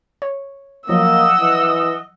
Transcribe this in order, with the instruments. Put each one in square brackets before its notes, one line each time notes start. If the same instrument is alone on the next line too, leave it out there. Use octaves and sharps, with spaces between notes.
[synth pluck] C#5
[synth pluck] F3 F#3 [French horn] A#3 [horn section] D#5 [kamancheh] F#5 E6
[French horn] E3